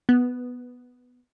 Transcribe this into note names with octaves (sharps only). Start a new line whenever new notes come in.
B3